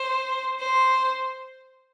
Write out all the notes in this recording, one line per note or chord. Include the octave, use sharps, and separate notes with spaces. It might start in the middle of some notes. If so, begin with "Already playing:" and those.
Already playing: C5
C5